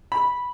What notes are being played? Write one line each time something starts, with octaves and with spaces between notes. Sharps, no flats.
B5